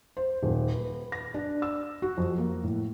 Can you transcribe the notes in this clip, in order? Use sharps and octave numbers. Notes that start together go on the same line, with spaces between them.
C5
D#1
B4
A#6
D4
E6
F#4
F2
A#3
A2